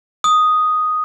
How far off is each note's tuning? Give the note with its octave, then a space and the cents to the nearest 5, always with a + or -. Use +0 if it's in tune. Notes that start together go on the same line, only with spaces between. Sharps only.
D#6 +0